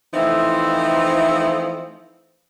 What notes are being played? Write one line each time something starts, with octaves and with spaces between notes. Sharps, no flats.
E3 F3 A3 C4 D#4 E4